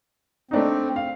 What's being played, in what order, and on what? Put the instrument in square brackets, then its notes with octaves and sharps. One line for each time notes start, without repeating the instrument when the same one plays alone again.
[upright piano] A3 D4 D#4 [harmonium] C4
[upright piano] F5